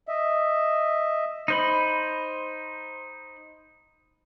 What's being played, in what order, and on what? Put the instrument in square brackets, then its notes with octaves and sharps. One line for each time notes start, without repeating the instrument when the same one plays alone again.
[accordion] D#5 E5
[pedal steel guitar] D#4 C5 B5